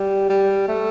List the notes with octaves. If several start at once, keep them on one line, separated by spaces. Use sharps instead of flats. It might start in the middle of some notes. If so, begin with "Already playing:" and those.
Already playing: G3
G3
A3